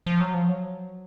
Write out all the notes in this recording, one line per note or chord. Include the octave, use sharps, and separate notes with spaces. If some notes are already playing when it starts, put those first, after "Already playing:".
F3
F#3
F3
F#3